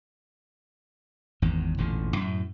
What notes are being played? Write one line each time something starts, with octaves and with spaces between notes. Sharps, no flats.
G#1 E2 G#2
E1 A1 A#2 D3
F#2 A2